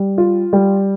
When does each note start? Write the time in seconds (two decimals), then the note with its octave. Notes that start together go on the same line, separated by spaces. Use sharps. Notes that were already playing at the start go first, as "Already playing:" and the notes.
Already playing: G3
0.18 F4
0.53 G3